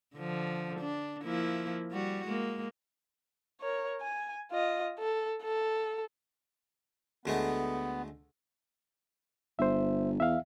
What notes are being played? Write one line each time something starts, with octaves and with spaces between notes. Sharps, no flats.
D3 F3
D4
F3 A#3 E4
G3 F#4
G#3 A#3
A#4 C#5
G#5
F4 D#5
A4
A4
D2 G#3 A3 B3
G1 C5 E5
E2 E5 F5